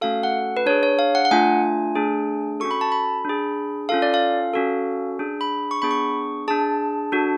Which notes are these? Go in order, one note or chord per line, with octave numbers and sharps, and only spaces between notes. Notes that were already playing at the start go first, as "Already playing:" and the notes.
A3 C#4 F#4 A4 F5
F#5
B4
D4 G#4 C#5
C#5
F5
F#5
F#5
A3 D4 F4 G#5
A3 D4 G#4
C#4 F#4 A4 C#6
B5
A5
B5
D4 G#4
C#4 F4 A4 F5
D5
F5
C#4 F#4 A4
D4 G#4
B5
C#6
B3 D4 G#4 B5
C#6
D4 G#4 A5
D4 F#4 A4